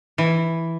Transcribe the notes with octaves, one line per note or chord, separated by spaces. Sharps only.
E3